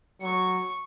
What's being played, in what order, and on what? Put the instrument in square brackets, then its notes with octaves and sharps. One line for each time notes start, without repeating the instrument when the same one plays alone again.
[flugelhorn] F#3 [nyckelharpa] C#6